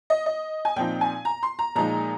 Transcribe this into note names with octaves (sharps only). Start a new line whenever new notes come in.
D#5
D#5
G#5
A#2 F3 C4 D#4 G5
G#5
A#5
C6
A#5
A#2 F3 G#3 D#4 A#5